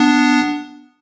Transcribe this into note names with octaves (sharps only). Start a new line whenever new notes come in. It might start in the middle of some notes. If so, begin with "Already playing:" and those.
Already playing: B3 D4